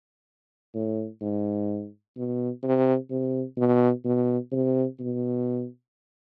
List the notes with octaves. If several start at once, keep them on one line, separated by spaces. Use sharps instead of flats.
A2
G#2
B2
C3
C3
B2
B2
C3
B2